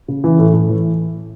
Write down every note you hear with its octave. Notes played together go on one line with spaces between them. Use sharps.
C#3
E3
A2
A2
E3